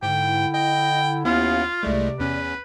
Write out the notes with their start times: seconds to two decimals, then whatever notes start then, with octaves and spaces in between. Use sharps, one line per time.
0.03 G#2 D3 E4 G5
0.54 D#5 G5
1.25 D#2 B3 C#4 E4 F4 F5
1.83 C2 C3 G#3 A3 D5
2.20 E2 C#4 B4